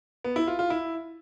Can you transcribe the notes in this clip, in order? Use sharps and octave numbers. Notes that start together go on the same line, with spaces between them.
B3
E4
F4
F4
E4